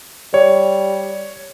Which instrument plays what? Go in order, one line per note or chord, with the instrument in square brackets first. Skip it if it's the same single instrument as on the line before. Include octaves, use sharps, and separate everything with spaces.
[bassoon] G3 [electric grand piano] C#5